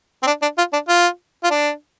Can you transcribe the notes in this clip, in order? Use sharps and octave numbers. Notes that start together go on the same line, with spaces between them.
C4
D4
D4
F4
D4
F4
F4
D4